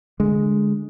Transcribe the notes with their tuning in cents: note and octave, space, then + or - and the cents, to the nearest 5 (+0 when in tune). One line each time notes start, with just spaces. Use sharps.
D3 +0 G#3 +0